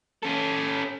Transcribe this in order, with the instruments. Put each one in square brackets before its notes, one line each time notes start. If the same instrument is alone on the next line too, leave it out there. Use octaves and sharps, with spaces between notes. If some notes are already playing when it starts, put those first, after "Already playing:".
[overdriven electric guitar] C#4 A4